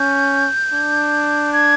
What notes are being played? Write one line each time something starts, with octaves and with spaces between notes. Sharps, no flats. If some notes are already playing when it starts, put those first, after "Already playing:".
Already playing: C#4 G6
D4
G#6